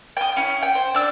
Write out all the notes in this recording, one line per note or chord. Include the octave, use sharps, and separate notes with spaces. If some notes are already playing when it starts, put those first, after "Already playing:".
G5 D#6
C#4 E4
G5
C5
D4 E6